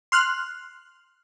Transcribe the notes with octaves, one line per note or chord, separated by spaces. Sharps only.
C6 F6 F#6